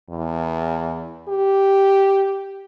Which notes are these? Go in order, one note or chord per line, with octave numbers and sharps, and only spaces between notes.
E2
G4